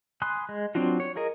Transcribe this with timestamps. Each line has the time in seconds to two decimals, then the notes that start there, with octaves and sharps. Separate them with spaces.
0.22 G#5 B5 C6 D#6 F#6
0.49 G#3
0.75 F#3 C4 D4 F4 F#4
1.00 C#5
1.16 F4 G#4 A#4 D#5